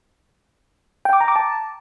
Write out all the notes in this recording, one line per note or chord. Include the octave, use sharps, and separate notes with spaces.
G5
D6
A#5
D6
A5